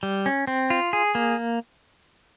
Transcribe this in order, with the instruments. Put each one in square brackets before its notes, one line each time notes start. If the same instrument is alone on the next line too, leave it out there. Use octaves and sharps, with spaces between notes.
[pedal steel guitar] G3
C#4
C4
F4
G#4
A#3